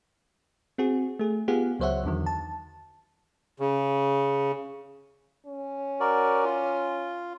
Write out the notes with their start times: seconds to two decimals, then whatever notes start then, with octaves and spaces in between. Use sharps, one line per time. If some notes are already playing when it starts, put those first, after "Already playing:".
0.78 C4 F#4 G#4
1.19 A3 G#4
1.48 B3 F4 G4 G#4 F5 F#5
1.80 C#2 F#3 C5 C#5 E5 F#5
2.04 E2 D3 D#3 F#3
2.26 A5
3.60 C#3
5.46 C#4
6.00 F#4 A#4 D5
6.45 F4